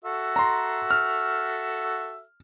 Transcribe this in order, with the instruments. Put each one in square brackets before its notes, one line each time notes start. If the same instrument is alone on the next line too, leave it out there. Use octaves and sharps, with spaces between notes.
[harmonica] F#4 A4 E5
[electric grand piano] A#5 C6
F6